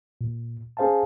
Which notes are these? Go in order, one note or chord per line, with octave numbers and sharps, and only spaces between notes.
A#2
C#4 G#4 C5 F5 G#5 A5